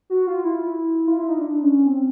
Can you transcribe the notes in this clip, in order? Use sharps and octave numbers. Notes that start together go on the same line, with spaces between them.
F#4
F4
E4
F4
E4
D#4
D4
C#4
C4